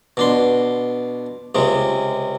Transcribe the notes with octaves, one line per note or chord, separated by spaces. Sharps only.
B2 D4 C6
C#2 C3 G#3